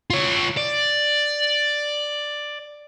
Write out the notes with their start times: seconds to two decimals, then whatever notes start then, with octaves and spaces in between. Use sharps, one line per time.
0.10 F4 C#5
0.57 D5